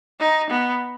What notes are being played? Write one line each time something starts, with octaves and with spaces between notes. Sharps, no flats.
D#4
B3